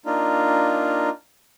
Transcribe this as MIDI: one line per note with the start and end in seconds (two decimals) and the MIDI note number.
0.06 1.09 58
0.06 1.09 62
0.06 1.09 63
0.06 1.09 65